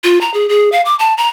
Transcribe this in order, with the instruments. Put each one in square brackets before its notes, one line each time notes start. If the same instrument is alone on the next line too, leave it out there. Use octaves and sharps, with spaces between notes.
[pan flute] F4
A#5
G#4
G#4
F5
D6
A5
A#5